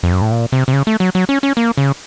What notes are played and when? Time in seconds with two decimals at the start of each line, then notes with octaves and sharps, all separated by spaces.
0.03 F2
0.12 F#2
0.22 A2
0.31 A#2
0.52 C3
0.68 C3
0.73 C#3
0.87 A3
1.00 F#3
1.15 F#3
1.29 C#4
1.43 C#4
1.57 A#3
1.77 C#3